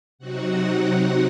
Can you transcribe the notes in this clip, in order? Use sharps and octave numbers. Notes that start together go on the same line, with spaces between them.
C3 F#3 C4 D#4 F#4 F#5